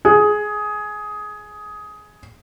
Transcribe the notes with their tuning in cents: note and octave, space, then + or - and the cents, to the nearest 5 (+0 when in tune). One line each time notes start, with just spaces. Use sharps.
G#4 +10